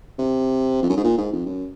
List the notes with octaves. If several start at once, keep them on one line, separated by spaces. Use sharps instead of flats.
C3
F2
F#2
G#2
A#2
G#2
F2
F#2